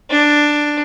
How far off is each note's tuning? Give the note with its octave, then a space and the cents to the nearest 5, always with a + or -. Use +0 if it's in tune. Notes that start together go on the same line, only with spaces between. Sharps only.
D4 +5